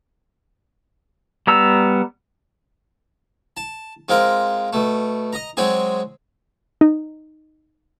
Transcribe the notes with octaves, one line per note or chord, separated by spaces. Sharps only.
G3 B3 A#5 E6
A5
G#3 C4 F4 A#4
B2 A3
D#5 A#5
F#3 G#3 C4 G#4
D#4